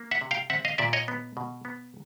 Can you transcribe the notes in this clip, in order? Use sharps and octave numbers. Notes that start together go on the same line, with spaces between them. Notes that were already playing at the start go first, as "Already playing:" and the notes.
Already playing: A#3
E5 F#5
C3
F5 G5
C4 E5 F#5
D#5 F5
A#2 D5 E5
C#5 D#5
B3
B2
B3